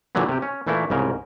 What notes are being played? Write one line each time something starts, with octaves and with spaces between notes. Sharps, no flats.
A#2 D3 E3 F#3 G3
C3 G4
C#4
A#2 E3 A3 A#3 E4
C2 G#2 C#3 A#4